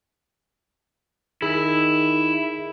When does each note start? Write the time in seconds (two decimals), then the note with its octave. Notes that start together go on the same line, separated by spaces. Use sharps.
1.42 D#3 E4 G#4